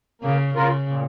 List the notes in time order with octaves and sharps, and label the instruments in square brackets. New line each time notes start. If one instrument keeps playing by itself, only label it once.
[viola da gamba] C#3 [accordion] A#3
[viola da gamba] C#3 [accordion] F4 A#4
[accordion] A#2